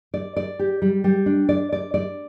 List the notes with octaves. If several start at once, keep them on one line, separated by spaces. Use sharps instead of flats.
D5
D5
G4
G3
G3
D4
D5
D5
D5